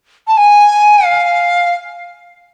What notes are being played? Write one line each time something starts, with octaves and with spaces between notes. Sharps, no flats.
A5
G#5
F5